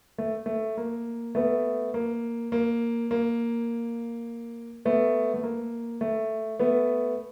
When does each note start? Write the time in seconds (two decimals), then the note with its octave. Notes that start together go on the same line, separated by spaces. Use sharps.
0.18 A3
0.46 A3
0.77 A#3
1.35 A3 B3
1.94 A#3
2.52 A#3
3.11 A#3
4.85 A3 B3
5.34 A3
5.43 A#3
6.01 A3
6.60 A3 B3